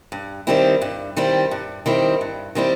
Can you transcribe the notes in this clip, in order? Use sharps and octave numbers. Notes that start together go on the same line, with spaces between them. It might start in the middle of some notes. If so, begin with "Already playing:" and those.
G2
D#3 G3 C4 E4
G2
D#3 G3 C4 E4
G2
D#3 G3 C4 E4
G2
D#3 G3 C4 E4